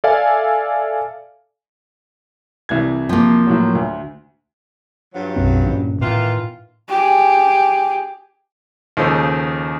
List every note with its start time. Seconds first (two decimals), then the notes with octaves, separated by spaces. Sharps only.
0.04 A4 D5 E5 F5 G#5
2.69 C2 E3 G#6
3.09 F3 A#3
3.47 A2 F#3
3.75 D2
5.14 G2 F3 F#3
5.36 B1 F#2 C4
5.66 G1 A#2 C#4
6.01 A2 D#3 E3 B3 F4
6.89 G4 G#4
8.97 D#2 C#3 F3 D#4 A4 C5